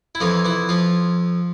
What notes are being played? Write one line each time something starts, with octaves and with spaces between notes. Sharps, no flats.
E4
F2 E3 F3 F4
E3 E4
F3 F4